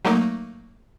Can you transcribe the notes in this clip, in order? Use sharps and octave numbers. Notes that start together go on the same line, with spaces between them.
F#3 A3 A#3 D#4